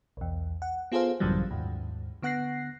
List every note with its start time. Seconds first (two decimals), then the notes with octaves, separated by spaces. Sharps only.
0.17 B1 E2
0.62 F#5
0.92 B3 F4 G#4 A4 C5 F5
1.20 A1 F#2 C#3 E3 F#3 G3
1.51 D#2 G#2
2.22 D3 B3 F#5 F#6 A#6 C7